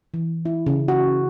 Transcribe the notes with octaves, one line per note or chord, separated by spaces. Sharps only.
E3
E4
C#3
F#4